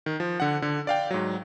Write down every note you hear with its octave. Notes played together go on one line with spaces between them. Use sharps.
D#3
F3
D3 F#5
D3
D5 F5 G5
G#2 F#3